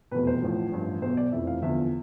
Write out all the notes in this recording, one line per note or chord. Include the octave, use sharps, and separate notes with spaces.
F1 E2 B2 B4
C5
A1 A2 F3
A1 G2 F3
B1 B2 C5
D5
F1 F2 E3 E5
F5
E2 D3 F3 E5